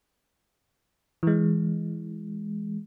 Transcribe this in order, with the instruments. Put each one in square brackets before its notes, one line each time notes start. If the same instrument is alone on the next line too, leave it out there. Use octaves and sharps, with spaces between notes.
[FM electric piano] E3 G#3